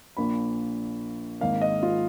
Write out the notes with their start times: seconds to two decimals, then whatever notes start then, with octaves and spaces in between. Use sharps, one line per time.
0.17 A#1 A#2 F3 A#3 B5
1.41 G#1 G#2 D#3 A#3 F5
1.61 D#5
1.83 F4